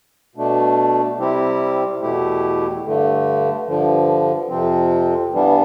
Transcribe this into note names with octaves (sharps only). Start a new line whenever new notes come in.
B2 A3 D4
C3 G3 C4 E4 G4
E2 B2 A3 E4 G4
G2 D3 A3
G2 D3 F3
F2 C3 F3 C4
G2 E3 G3 B3 D4